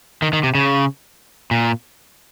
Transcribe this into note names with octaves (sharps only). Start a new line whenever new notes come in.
D#3
D#3
C3
C#3
A#2